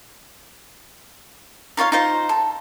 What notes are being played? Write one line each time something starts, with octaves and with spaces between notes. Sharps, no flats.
D#4 F4 C#5 F5
D#4 F4 C5
A4